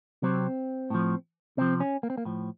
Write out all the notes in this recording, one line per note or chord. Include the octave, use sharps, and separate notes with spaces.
C3 F#3 C4
A2 F3
C3 F3 C4
C#4
A#3
C4
A#3
A2 F3